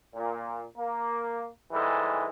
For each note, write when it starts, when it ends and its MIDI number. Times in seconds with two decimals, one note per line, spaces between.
0.14 0.64 46
0.76 1.46 58
1.72 2.28 44
1.72 2.28 52
1.72 2.28 55
1.72 2.28 56
1.72 2.28 69